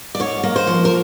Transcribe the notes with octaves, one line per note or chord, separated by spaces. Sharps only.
D5
G#2 C#5
A#3
C5
F3
A#4